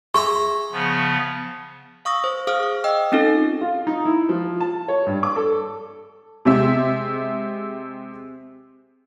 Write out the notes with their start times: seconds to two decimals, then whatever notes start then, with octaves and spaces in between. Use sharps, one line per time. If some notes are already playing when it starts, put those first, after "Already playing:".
0.14 G#4 E5 A#5 C#6
0.72 C#3 F3 B3
2.05 F5 C#6 D#6 E6 A#6
2.24 C5
2.47 G#4 C5 F5 D6 D#6 F6
2.63 F5
2.84 D#5 G5 E6
3.12 C4 C#4 D#4 F4 A4
3.61 F4
3.87 D#4
4.05 E4
4.29 F3
4.60 A5
4.88 C#5
5.06 G2
5.23 D6
5.36 A4
6.45 C3 G#3 C4 E5